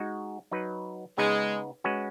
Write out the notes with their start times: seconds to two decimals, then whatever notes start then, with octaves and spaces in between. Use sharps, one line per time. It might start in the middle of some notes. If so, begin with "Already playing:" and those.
Already playing: G#3 D#4 F#4
0.51 F#3 D#4 B4
1.17 C#3 G#3 B3 D#4 B4
1.84 G#3 C#4 F#4 B4